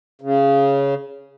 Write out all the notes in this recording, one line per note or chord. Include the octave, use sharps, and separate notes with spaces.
C#3